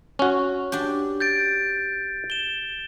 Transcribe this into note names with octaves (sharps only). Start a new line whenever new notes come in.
C#4 F#4
D4 G4
G6 A6 D7
E7 G7